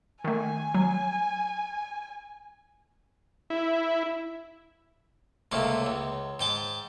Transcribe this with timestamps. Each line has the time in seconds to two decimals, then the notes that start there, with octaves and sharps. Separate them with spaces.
0.24 D#3 A3 G#5
0.74 F#3
3.50 E4
5.52 C#2 C3 A3 A#3
5.86 C#2
6.40 G#2 G5 A5